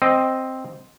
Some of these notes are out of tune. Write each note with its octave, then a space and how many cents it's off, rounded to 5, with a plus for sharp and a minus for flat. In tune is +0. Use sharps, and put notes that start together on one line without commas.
C4 +0 D#5 +0